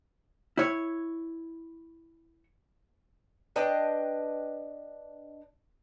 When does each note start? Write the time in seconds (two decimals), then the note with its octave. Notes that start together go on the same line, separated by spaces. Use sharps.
0.57 E4 C#5
3.56 D4 B4 D#5 G5